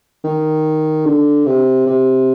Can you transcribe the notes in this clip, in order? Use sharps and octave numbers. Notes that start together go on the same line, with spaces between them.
D#3
D3
C3
C3